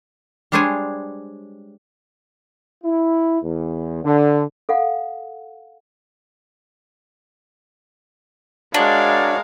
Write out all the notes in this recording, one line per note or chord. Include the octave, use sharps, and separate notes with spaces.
G3 G#3 D4 C5 C#5 G#5
E4
E2
D3
A4 F5 F#5
G#3 D4 F#4 A#4 C#5 D5 F5